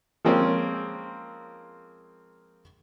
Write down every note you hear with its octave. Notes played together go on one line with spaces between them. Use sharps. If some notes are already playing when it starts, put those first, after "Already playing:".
F3 G#3 A#3 C4 C#4